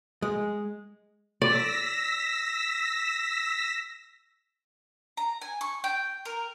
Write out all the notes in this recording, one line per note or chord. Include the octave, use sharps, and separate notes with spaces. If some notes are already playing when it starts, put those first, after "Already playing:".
G#3
D5 E6 A#6 B6
A#5
G#5
C#6
G5
A#4